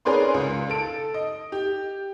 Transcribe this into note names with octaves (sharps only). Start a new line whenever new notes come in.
C#4 G#4 A#4 B4 D5 C6
C#2
A4 D7
D#5
G4